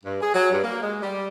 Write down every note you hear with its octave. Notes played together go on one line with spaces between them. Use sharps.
G2
G#4
F#3
G2
A#3
G#3
G3